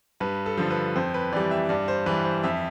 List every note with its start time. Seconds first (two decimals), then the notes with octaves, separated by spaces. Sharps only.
0.20 G2 B4
0.46 A4
0.57 D3 F3
0.71 B4
0.96 F2 C5
1.14 B4
1.32 E3 G3 D5
1.51 E5
1.69 G2 D5
1.88 C5
2.06 E3 G3 B4
2.25 C5
2.43 F2 E5